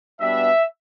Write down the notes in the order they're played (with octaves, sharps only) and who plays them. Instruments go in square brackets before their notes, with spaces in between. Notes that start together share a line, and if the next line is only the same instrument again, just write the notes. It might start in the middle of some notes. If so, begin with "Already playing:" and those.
[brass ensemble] B2 G3 B3 D4 E5